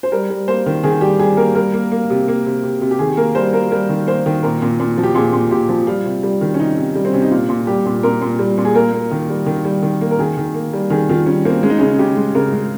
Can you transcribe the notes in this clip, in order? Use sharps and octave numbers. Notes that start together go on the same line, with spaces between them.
C5
G3 A#4
G3
A#3 C5
D#3
D#3 G#4
G3 G4
G3 G#4
A#3 A#4
G3 A#4
A#3
A#3
C3
A#3
C3
C3
C3
G4
D#3 G#4
A#3 A#4
G3 C5
A#3 A#4
G3 A#4
D#3
A#3 C5
D#3
A#2 A#4
A#2
A#2
F3
G4
A#2 G#4
A#2
A#2 G4
F3
G3 F4
C3
G3
D#3
C#4
C3 D#4
C3
G3
C4
C3 C#4
D#4
A#2 F4
A#2
G3 G4
A#2
A#2 A#4
A#2
G3
A#2
G#4
A#3 A#4
A#3
D#3
G3
D#3
G3
D#3
A#3
A#4
D#3 G#4
D#3
A#3
G3
D#3 G#4
D#3 F4
G3 C#4
A#3 C4
G#3 C#4
D#4
C#3 C#4
C#3 G4
G#3
C#3 A#4
G#3